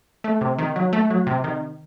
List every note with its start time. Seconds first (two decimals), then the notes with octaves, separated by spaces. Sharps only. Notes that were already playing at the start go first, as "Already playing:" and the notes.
0.24 A3
0.41 C3
0.58 D#3
0.76 F#3
0.93 A3
1.10 F#3
1.27 C3
1.44 D#3